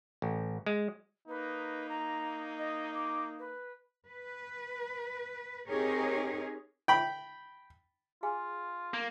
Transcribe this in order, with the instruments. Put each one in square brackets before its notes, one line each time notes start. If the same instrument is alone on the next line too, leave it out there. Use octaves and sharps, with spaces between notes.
[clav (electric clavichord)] A1
G#3
[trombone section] A#3 D#4 [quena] B4
[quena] A#5
D#5
D6
B4
[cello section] B4
C4 D#4 G4 G#4 A#4 C#5
[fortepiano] G5 B5
[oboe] F4 [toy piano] G#4 F5 G#5
[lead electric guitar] A#3